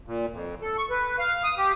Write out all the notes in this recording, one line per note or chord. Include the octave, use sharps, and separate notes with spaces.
A#2
F2
A4
C#6
B4
F5
D#6
G4